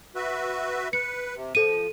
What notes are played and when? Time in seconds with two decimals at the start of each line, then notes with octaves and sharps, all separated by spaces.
0.15 F#4 B4 E5
0.93 B4 C#7
1.36 C3
1.55 F3 A4 D#7